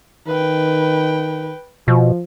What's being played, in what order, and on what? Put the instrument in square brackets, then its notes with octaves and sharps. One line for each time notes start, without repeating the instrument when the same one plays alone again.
[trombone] D#3 [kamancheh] B4 G5
[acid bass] B2 [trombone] F3